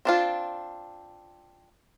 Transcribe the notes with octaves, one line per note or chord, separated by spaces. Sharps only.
C4 D4 F4